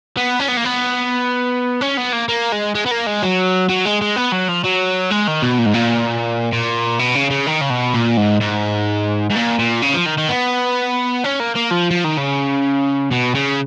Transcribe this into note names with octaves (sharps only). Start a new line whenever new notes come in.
B3
C#4
B3
A#3
B3
C#4
B3
A#3
A#3
G#3
G#3
B3
A#3
G#3
F#3
F#3
G#3
G#3
B3
F#3
F3
F#3
G#3
D#3
B2
A#2
G#2
A#2
A#2
B2
C#3
C#3
D#3
C#3
B2
A#2
G#2
G#2
G#2
A#2
A#2
C#3
F3
D#3
D#3
B3
C#4
A#3
A#3
F3
F3
D#3
C#3
B2
C#3